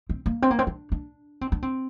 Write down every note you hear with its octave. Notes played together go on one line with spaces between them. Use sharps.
C4
A#3
C4
A#3
C4
D4
D4
C4
D4
C4